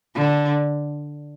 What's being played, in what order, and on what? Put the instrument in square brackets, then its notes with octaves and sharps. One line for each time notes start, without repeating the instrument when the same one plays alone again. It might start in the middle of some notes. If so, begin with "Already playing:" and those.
[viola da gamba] D3